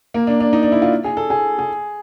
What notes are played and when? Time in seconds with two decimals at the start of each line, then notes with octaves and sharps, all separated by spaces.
0.14 A#3
0.27 D4
0.40 D4
0.53 D#4
0.63 D4
0.72 E4
0.82 F4
1.04 G#4
1.17 A4
1.30 G#4
1.59 G#4